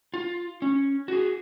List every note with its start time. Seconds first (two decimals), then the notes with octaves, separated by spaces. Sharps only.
0.14 F4
0.62 C#4
1.08 F#4 G#4